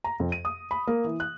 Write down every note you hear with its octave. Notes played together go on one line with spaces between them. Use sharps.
A#5
F2
D#7
D#6
B5
A#3
E3
F#6